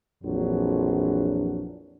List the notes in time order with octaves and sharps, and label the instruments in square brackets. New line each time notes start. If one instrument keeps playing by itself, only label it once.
[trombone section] A#1 F2 E3 F#3 D4